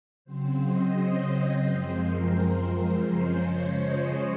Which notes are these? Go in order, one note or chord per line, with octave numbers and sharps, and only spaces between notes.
C#3 F#3 C4 C5
D#5
F#2 F3 G#3 C4 C5
A#4
C#3 F3 G#3 C#4 C5
C#5
D#5